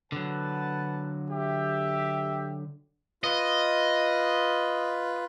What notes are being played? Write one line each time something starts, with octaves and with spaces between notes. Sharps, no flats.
D3 F#3 B4 F#5 A5
G4 E5
F4 B4 D#5